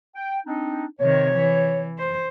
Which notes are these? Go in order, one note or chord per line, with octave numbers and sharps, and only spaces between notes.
G5
C4 D4 D#4
C3 D#3 C#5
E3
C5